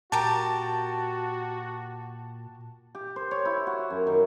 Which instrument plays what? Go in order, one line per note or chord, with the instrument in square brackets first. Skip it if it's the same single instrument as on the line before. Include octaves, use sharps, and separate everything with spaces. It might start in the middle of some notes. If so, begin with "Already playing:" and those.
[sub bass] A#2 [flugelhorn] F#4 [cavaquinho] G4 A#4 [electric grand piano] A5
[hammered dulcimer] G4
C5
C#5
E4
F#4
F#2
D#3